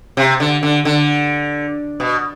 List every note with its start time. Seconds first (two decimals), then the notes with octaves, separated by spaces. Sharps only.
0.17 C3
0.40 D3
0.63 D3
0.85 D3
2.00 B2